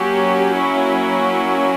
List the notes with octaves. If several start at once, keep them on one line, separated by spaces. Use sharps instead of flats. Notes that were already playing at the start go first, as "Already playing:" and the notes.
Already playing: F#3 A#3 C#4 G4
E4